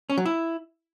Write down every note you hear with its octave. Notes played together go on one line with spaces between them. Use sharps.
C#4
F#3
E4